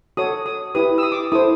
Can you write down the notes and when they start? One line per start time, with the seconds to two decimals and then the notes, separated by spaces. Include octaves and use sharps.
0.17 F#4 A4 C#5 D#6
0.46 D#6
0.75 E4 G4 B4 D#6
0.98 E6
1.03 D#6
1.12 D6
1.32 E4 A4 C5 D#6